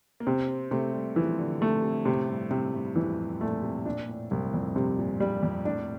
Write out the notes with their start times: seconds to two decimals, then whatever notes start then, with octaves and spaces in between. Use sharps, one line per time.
0.20 A#3
0.27 C3 C4
0.48 C4
0.71 C3 A3
0.93 G3
1.16 E3 F3
1.38 D3
1.61 C3 A3
1.83 C3
2.05 A2 C3
2.29 G2
2.51 C3
2.74 G2
2.96 F2 E3
3.40 A#2 A3
3.63 C3
3.86 A#2 D4
4.08 A2
4.31 C2 G2
4.54 F2
4.76 G2 C3
4.99 A#2
5.20 G2 G3
5.43 F2
5.65 A2 D4